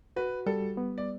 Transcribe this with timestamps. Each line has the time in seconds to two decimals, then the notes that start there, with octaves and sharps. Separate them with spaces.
0.16 F#4 B4
0.46 G3 A4
0.77 B3
0.98 D5